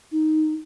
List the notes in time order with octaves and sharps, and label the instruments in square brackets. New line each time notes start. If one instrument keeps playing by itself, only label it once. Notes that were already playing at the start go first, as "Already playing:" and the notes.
[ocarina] D#4